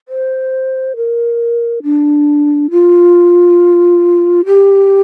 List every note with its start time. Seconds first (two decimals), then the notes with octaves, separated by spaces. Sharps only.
0.08 C5
0.96 A#4
1.83 D4
2.71 F4
4.46 G4